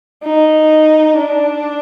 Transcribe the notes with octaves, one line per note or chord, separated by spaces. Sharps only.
D#4
D4